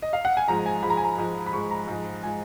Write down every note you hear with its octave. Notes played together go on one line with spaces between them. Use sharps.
D#5
F5
F#5
G#5
G#2 F3 G#3 A#5
G#5
G#2 F3 G#3 B5
A#5
G#5
A#5
G#2 F3 G#3
B5
G#2 F3 G#3 C#6
A#5
G#2 F3 G#3
F3 G#3 G#5